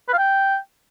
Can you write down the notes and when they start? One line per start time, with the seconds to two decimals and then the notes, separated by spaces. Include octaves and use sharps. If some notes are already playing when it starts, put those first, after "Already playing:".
0.08 B4
0.13 F5
0.18 G5